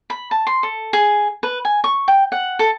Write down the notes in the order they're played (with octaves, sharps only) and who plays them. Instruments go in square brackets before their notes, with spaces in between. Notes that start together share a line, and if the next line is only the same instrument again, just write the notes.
[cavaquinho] B5
A5
C6
A4
G#4
B4
G#5
C#6
G5
F#5
A4